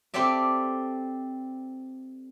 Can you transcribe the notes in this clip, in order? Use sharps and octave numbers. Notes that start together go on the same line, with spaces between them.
C4 G4 A4 D5 E5